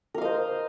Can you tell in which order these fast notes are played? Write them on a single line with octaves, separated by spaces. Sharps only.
A#4 F5 D#5 C5